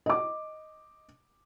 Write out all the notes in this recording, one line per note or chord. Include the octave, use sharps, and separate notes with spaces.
D#5 D6